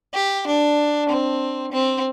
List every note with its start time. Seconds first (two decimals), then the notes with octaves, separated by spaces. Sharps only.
0.14 G4
0.47 D4
1.09 C4
1.72 C4